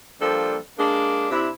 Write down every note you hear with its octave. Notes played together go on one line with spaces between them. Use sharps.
F3 G3 A#3 D4 A4
G#3 A#3 D4
C3 D4 E4